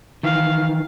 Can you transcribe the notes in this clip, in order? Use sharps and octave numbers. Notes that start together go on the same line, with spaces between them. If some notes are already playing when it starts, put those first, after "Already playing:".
D#3 E3 F5